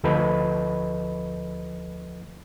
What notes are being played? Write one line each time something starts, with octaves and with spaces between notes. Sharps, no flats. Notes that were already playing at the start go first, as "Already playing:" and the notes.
D2 F3 A4 B4 D#5 B5